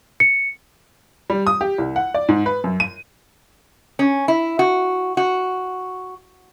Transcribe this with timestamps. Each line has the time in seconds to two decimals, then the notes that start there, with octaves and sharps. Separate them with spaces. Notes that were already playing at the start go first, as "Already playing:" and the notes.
0.20 C#7
1.30 G3
1.47 D#6
1.61 G4
1.78 C2
1.96 F#5
2.14 D5
2.29 G#2
2.46 B4
2.64 F#2
2.80 D#7
3.99 C#4
4.28 E4
4.59 F#4
5.17 F#4